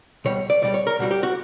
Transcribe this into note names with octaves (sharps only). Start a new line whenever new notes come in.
C#2 B2 G3 C#5
D5
C#2 B2 G3 D5
C#5
A#4
C#2 B2 G3 F#4
G4
F#4